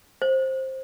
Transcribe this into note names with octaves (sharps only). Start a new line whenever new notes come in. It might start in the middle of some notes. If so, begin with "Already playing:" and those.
C5